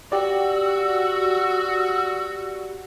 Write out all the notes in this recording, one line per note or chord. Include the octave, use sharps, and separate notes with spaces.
F#4 G4 D5 E6